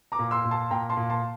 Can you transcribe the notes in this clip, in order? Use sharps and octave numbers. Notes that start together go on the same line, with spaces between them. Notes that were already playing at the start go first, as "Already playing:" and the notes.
A#5 D6
A#2
C6 E6
A#2
A5 C6
A#2 G5 A#5
A5 C6
A#2
A5 C6